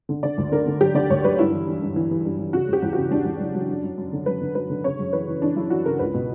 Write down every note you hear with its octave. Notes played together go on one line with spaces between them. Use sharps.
D3
D3 D5
D2
D3 A#4
D3
F#3 G4
D3 D5
D2 C#5
F#3 B4
G2 E4
E3
E3
G2
E3
E3
G2
E3
C#3 F#4
E2 G4
E2
C#3 F#4
E2 D4
E2
F#3
F#3
F#2
F#3
F#2
D3
F#2 B4
D3
F#3 B4
D3
C#3 C#5
F#2
E3 B4
E3
E3 D4
F#2 E4
E3 F#4
C#3 A#4
C#2 B4
B2